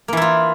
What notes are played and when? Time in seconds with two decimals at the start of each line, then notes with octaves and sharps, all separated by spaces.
0.08 A#3
0.13 E3
0.17 E4
0.22 F4